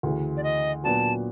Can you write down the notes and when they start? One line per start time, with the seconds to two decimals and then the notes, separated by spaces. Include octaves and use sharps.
0.03 D2 C#3 E3
0.37 D5
0.44 D#5
0.84 A#2 F#3 B3 D4 F#4 A5